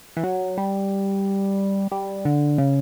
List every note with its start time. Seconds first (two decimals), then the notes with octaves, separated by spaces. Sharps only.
0.17 E3
0.23 F#3
0.58 G3
1.92 G3
2.25 D3
2.58 C#3